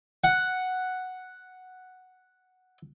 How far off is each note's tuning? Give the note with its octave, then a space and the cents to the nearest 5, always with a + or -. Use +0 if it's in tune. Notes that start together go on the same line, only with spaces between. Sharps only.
F#5 +0